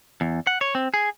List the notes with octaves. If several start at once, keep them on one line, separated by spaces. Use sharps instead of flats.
E2
F#5
C#5
C4
G#4